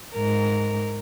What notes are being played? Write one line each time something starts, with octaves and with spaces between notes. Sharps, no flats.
G#2 A#4